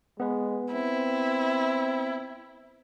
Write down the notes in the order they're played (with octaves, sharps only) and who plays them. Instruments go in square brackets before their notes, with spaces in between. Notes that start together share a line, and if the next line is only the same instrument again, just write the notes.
[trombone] G#3 [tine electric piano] B3 B4
[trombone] C4 [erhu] E4